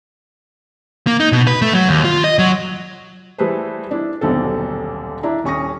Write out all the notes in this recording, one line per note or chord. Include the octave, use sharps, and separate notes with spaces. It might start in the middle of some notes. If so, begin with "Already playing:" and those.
A#3
D#4
B2
B4
A3
F#3
D#2
F4
D#5
F#3
E3 G3 A3 G#4 B4 C5
D4 E4
D#1 B1 D3 C4 A4
D4 E4 E5 A#5
D#1 C#4 C#6 D#6 A#6